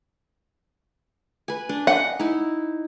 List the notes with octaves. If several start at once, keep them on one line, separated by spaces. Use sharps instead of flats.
B4 G#5
D4
D#5 F#5
D#4 E4